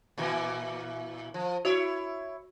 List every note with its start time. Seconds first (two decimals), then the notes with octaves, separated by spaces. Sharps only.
0.18 A#2 E3 A#3
1.34 F3
1.65 E4 F#4 C#5